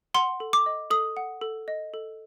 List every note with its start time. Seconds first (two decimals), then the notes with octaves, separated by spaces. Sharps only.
0.14 F#5 C6
0.40 A4
0.53 D6
0.66 D#5
0.90 A4 D#6
1.17 F#5
1.41 A4
1.68 D#5
1.94 A4